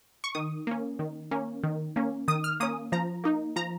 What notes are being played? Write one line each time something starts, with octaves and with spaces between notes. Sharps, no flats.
C#6
D#3 D#6
A#3 C#4
D#3
A#3 C#4
D#3
A#3 C#4
D#3 D#6
F6
A#3 C#4 D#6
F3 A#5
A#3 D#4
F3 A#5